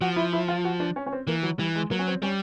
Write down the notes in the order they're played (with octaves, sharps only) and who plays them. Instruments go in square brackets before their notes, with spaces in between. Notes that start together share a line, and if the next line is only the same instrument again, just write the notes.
[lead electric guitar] F3 [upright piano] F#4
[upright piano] E4
E4
F4
F#4
D4
C#4
C#4
C4
[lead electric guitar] E3 [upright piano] A#3
[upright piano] F#3
[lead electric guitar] E3 [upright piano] G3
[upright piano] G#3
[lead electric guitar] F#3 [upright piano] A#3
[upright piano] C#4
C4
[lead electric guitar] G3 [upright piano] C#4